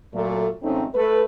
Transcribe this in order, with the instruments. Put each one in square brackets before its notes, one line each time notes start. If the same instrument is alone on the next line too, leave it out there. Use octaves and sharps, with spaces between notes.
[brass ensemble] A#2 F#3 A3
G#1 F2 A3 C4 C#4 D#4
A3 B4